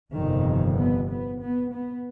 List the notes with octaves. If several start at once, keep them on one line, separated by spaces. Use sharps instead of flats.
G1 F2 C3 D#3
B3
B3
B3
B3